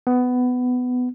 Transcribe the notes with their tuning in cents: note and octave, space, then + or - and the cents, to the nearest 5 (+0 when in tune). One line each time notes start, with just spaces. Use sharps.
B3 +15